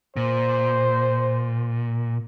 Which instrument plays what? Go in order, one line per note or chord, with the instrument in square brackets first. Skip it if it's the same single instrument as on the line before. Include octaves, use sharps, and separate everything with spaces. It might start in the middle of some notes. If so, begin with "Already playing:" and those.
[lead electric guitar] A#2 [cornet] C5